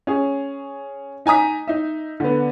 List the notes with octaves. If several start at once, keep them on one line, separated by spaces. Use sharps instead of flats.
C#4 G#4
D#4 G#5 A#5 D#6 B6
D#4 E5
D3 B3